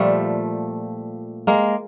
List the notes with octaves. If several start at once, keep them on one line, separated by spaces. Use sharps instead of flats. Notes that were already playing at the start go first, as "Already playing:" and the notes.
Already playing: A#2 F3 G3 A3
G#3 A#3